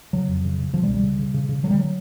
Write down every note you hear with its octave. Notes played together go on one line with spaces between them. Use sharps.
C#3 F#3
F2
C#3
C#3
B2 F3
G3
C#2
G3
C#3
C#3
C#3
C#3
D3 F#3
G3
F#3